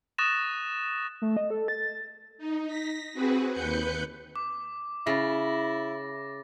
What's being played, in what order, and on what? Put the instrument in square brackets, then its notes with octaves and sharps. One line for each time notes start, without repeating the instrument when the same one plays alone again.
[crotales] C#6 D#6 F#6 A6 A#6 E7
[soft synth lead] A3
D#5
A4
A6
[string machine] D#4
A#6 B6
C4 F#4 G#4 B4
D#2 B4 F#6 G6 C#7
[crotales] D6
[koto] C#3 [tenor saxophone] E4 [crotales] A6 A#6